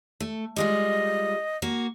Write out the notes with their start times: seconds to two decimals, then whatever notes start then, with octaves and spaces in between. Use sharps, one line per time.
0.20 A3
0.56 G3 G#3 F4 D#5
1.62 A#3 F#4